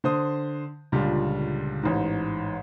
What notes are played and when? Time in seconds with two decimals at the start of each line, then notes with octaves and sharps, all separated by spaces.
0.04 D3 C5 D#6
0.92 C#2 A#2 D3 G3
1.83 A1 G#2